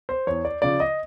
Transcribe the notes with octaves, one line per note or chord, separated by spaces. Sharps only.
C5
E2 C#5
D5
C#3 F3 D5
D#5